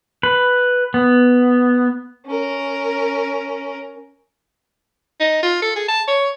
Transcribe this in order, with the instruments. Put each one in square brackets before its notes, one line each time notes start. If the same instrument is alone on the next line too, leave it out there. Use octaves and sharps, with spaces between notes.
[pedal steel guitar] B4
B3
[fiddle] C#4 A#4
[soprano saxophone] D#4
F4
A4
G#4
A5
C#5